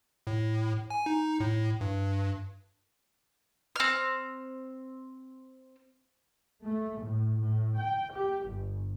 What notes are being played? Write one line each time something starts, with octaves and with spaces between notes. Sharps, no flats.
A2
G#5
D#4
A2
G2
C4 F6
A3
A2
A2
G5
G4
G1